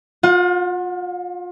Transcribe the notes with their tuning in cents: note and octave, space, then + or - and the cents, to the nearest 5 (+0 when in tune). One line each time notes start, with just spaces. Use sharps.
F4 +30 F#5 -25